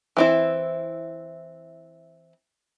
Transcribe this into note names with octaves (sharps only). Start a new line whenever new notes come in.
E3 C4 E4